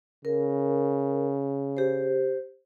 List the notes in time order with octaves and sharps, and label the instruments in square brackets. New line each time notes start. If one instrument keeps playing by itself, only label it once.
[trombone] C#3 [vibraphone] A#4
[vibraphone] G4 C5